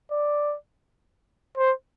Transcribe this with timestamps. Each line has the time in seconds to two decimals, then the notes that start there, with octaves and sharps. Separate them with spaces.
0.12 D5
1.57 C5